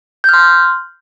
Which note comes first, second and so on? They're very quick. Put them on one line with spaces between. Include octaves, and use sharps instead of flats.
G6 F6 C6